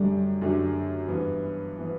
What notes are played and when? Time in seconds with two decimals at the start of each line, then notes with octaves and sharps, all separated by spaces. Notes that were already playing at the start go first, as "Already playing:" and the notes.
Already playing: F#2 D3 G3 A3 D4 G4
0.41 F#2 D3 A3 D4 G4
1.08 G2 E3 B3
1.78 E3 B3